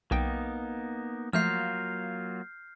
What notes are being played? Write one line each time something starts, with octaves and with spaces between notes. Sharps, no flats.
B1 A#3 B3 D#4 G5
F3 F#3 A3 A#3 F4 F6 G6 C7